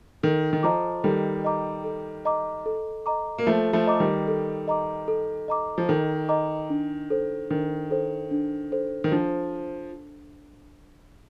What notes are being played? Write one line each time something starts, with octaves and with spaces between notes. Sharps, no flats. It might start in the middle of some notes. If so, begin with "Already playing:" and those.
D#3 A4
D#3
F3 D#5 A#5 D6
D#3 G3 A4
D#5 A#5 D6
A4
D#5 A#5 D6
A4
D#5 A#5 D6
A#3
F3 A3 A4
F3 A3
D#5 A#5 D6
D#3 G3
A4
D#5 A#5 D6
A4
D#5 A#5 D6
F3
D#3 A4
D#5 A#5 D6
D4
A4 C5
D#3 D4
A4 C5
D4
A4 C5
D#3
F3 D4